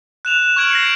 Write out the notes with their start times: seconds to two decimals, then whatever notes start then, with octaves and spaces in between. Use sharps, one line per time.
0.25 F#6 E7 F7
0.42 E7
0.56 C#6 F6 G#6 D7 F7 F#7
0.71 A#6 C7 C#7
0.83 G6 D7